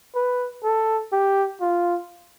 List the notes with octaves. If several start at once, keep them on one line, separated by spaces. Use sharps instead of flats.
B4
A4
G4
F4